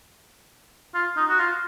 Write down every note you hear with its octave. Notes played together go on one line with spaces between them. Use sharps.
F4
D#4
F#4
F4